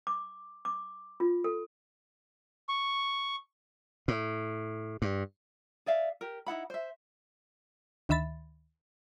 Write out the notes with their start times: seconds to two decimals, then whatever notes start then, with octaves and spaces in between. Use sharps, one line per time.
0.07 D6
0.65 D6
1.20 F4
1.44 A4
2.69 C#6
4.08 A2
5.02 G2
5.86 G#4 D5 E5 F5
6.21 G4 A#4
6.46 D#4 E4 F#5 B5
6.70 C5 E5
8.09 D2 D#3 E5 B5 A6